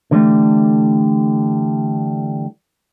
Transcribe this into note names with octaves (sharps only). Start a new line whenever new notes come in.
D3 E3 F#3 G3 A3